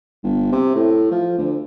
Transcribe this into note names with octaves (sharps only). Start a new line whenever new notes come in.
G1
C3
A2
F3
D2